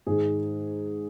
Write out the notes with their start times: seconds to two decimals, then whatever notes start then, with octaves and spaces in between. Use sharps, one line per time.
0.06 G#2 D#3 G#3 G#4